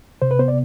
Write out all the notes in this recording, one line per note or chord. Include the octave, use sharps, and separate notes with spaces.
C3 C5
B4
B3 C5
D5